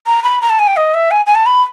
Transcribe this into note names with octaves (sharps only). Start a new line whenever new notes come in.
A#5
B5
A#5
A5
G#5
G5
D#5
E5
G#5
G#5
A5
B5